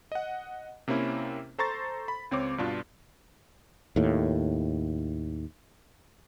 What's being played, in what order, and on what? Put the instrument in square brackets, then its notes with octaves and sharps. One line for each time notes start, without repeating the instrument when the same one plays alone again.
[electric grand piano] D#5 F#5
C3 A#3 C4 C#4 E4
A4 C5 A#5 C6 C#6 A6
B5
C#2 C4 C#5 D6
G2 B2 D4 F4
[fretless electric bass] D#2 A2